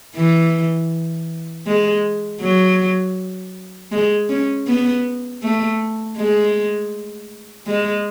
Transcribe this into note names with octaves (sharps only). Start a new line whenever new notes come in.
E3
G#3
F#3
G#3
C#4
B3
A3
G#3
G#3